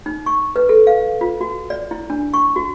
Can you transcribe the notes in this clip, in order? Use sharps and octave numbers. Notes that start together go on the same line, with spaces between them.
D#4
C#6
B4
A4
F5
F4
F#4
D5
E4
D4
C#6
F#4